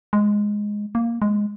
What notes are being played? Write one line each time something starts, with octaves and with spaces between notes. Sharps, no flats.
G#3
A#3
G#3